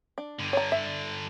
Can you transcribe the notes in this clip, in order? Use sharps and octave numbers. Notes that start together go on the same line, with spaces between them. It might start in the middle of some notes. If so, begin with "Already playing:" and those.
D4
G2 D3
C#5 A#5
E5